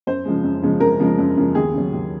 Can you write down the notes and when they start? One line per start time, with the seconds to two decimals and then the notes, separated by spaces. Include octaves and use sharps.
0.07 F#2 C5
0.25 C#3 F3 G#3
0.44 F#2
0.63 C#3 F3 G#3
0.80 F#2 A#4
1.00 C#3 F3 G#3
1.19 F#2
1.37 C#3 F3 G#3
1.55 D#2 G#4
1.74 C#3 F#3
1.93 D#2